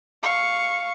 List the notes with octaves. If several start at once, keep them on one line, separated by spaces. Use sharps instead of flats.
F5 C#6